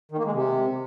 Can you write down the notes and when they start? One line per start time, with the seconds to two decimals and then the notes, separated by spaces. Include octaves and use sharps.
0.12 D#3
0.18 A#3
0.25 G#3
0.32 C3